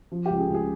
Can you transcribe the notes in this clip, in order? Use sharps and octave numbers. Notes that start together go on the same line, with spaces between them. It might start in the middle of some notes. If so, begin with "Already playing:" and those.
F3
C#2 G4
G#4
C#2 G#4